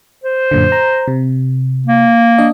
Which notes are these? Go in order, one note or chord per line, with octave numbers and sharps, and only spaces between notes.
C5
F#2 A#2 D3
A#5
C3
A#3
D4 D#5